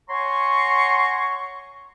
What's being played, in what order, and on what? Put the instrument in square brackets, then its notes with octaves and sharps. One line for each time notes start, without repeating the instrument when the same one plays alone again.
[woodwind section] C#5 F#5 G#5 A#5 C6 C#6